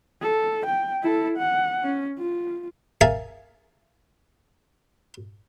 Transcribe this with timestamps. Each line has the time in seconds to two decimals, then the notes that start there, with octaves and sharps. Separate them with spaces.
0.21 A4
0.66 G5
1.02 E4 A4
1.37 F#5
1.84 C#4
2.18 F4
3.01 G#4 A#4 E5 F5 A5